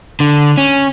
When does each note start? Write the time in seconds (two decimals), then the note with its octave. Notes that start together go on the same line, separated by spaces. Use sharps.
0.20 D3
0.58 C#4